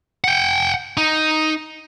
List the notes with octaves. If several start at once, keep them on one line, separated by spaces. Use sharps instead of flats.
F#5 G5
D#4